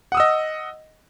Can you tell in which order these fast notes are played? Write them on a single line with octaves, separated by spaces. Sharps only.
F#5 D#6 E6 D#5